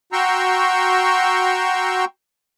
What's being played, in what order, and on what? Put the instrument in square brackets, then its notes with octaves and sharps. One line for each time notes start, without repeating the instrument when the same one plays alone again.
[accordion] F#4 G5 A#5 C6 C#6 E6